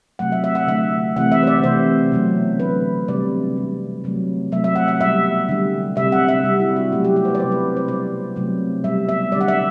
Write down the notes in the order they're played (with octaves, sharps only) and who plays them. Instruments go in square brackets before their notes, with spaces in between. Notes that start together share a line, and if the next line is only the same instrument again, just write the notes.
[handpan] C3 F#3 A3 F#5
E5
E5
F#5
D3 A3 E5
C3 E3 A3 F#5
E5
C5
D5
C3 E3 A3 C5
B2 F#3 A3
D3 A3 B4
C3 G3 D5
D3 G3
C3 F#3 A3
C3 F#3 A3 E5
E5
F#5
F#5
B2 G3 E5
D3 G3
C3 G3 E5
F#5
E5
C3 G3
E4
F#4
B2 F#3 A3 G4
G4
G4
C5
B4
D5
C3 G3 C5
B4
C5
B2 G3 D5
C3 F#3 A3
B2 G3 E5
E5
D3 G3 D5
F#5
E5